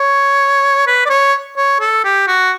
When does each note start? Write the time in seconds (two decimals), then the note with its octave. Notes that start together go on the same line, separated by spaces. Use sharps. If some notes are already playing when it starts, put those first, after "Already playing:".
Already playing: C#5
0.87 B4
1.05 D5
1.09 C#5
1.57 C#5
1.80 A4
2.04 G4
2.27 F#4